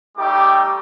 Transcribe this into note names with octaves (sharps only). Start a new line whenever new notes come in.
G3 A3 D#4 G4 D6